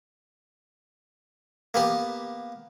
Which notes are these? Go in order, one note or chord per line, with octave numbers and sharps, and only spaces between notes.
A#3 B3 G4